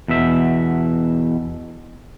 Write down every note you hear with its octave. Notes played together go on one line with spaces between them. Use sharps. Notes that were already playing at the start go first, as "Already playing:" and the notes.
E2 B2 E5